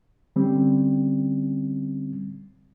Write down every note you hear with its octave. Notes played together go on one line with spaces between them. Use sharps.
D3 G3 C4 C#4